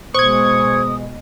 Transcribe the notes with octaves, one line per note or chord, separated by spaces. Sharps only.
B2 G#3 C5 C#6 D#6 G#6